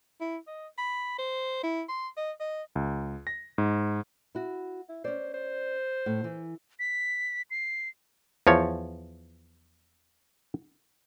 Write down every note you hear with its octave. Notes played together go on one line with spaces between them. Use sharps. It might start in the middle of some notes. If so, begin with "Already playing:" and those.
E4
D#5
B5
C5
E4
C6
D#5
D#5
C#2
A#6
G#2
E4 F#4
E4
C#4 C5 D5
C5
A2
E3
B6
C7
E2 F3 C#5